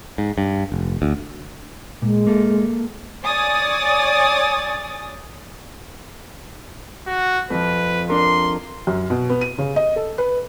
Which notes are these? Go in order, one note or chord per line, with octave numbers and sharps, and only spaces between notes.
G#2
G2
F1
D2
A#2 G#3
A#3 A4
C#5 D5 G#5 D#6 A6
F#4
F2 F3 B4
D4 A#4 C6
F#2
B2
B3
D#7
C#3
D#5
A4
B4